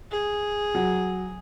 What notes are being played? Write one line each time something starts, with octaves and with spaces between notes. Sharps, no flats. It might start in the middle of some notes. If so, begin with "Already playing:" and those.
G#4
F#3